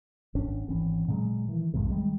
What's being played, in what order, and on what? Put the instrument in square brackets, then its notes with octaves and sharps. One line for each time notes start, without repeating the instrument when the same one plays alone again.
[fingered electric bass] G#1 C#4 D4
G#1 E3 C4 C#4
A#2 C#3 F#3 G#3
D#3 E3
B1 F2 G#2 C3
D#3 G3 G#3